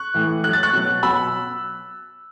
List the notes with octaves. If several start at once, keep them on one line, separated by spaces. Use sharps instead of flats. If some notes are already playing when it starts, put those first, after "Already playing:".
Already playing: C#6 F#6
A2 E3
A2 F#3 F#6
A6
C#6 F#6
B2 F#3
B2 F#3 B5 E6